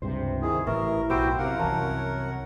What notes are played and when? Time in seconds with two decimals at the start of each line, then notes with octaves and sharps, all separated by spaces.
0.02 C#2 G2 C3 C5
0.42 D#3 E4 G#4
0.67 A1 A2 A#4 B4 E5 C#6
1.10 B1 F#4 G4 C5 B5 E6 D7
1.38 F#2 C3 A#4 F5 F#5
1.59 C2 E3 C#5 A5 A#5